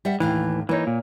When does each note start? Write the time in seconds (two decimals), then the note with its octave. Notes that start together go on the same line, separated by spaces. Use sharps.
0.05 G3 E5 F#5
0.20 D#2 A2 E3 F5
0.69 E3 A#3 D#4 C#5
0.87 A#2